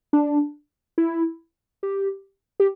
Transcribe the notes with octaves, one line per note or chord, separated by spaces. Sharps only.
D4
E4
G4
G4